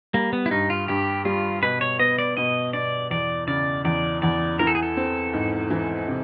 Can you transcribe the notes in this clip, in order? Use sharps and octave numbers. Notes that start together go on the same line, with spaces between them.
G3 A#3
B3
E4
G2 D#4
F4
G2 G4
G3 F4
B2 B4
C#5
B3 D#5
D5
B2 D#5
B2 D5
E2 D5
C#3 D5
E2 D5
E2 D5
E3 A#4
A4
G#4
A4
C4
G#2
E3
C3